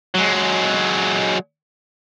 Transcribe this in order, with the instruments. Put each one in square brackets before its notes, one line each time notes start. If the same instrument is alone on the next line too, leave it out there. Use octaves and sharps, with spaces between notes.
[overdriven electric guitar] F#3 G#3